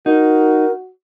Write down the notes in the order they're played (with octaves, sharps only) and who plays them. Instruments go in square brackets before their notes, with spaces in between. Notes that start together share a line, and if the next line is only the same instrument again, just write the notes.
[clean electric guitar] D#4 [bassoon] F#4 [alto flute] A#4